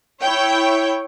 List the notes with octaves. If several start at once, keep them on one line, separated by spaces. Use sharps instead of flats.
E4 C#5 G5